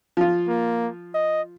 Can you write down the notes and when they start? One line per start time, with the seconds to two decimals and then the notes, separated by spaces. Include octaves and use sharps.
0.17 F3 F4
0.48 A#3
1.14 D#5